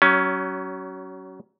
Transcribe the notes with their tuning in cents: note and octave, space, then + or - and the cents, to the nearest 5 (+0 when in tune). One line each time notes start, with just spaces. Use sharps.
F#3 +30 C#4 +10